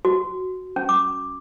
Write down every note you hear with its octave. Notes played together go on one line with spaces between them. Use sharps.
F#4
C#4
D6